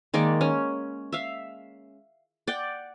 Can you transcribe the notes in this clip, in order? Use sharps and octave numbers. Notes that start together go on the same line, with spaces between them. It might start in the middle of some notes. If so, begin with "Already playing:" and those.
D#3 G#3 A#3 D5
C#4
E5 F5
D5 F#5 G5